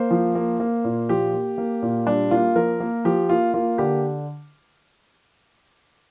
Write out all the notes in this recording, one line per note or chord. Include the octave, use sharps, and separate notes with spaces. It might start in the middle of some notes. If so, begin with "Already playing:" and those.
Already playing: A#3 C5
F3
A#3
A#3
A#2
F3 G4
A#3
A#3
A#2
G3 D4
A#3 F4
F3 A#4
A#3
F3 G4
A#3 F4
A#3 F4
D3 G4